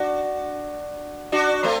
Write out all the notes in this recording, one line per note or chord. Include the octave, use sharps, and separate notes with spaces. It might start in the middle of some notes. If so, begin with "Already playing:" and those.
Already playing: D4 F#4
D4 F#4
A3 C4